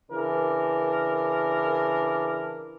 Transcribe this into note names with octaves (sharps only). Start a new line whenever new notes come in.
C#3 E3 D4 A#4